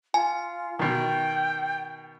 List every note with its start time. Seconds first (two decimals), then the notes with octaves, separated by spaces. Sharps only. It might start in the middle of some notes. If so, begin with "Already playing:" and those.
0.14 F4 G#5
0.79 B2 D#3 G5